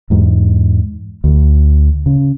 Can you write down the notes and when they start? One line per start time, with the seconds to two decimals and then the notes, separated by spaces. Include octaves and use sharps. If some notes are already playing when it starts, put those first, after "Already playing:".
0.10 E2 G#2
1.24 D2
2.06 C#3